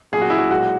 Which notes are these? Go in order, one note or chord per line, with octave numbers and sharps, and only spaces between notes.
B1 A#2 F#3 G#4
F#4
E4
F#4
B1 A#2 G#3 F#4